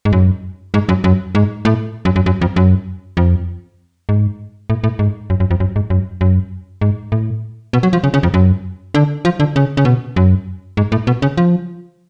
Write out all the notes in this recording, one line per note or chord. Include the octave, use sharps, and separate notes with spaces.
G#2
F#2
G#2
F#2
F#2
G#2
A2
F#2
F#2
F#2
F2
F#2
F2
G#2
A2
A2
G#2
F#2
F#2
F2
F#2
G#2
F#2
F#2
G#2
A2
B2
F#3
F3
C#3
C#3
F2
F#2
D3
F3
D3
C#3
C#3
B2
F#2
G#2
A2
B2
C#3
F3